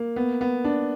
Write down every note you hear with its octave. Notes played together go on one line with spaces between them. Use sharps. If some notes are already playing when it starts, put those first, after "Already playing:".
Already playing: A#3
B3
B3
D4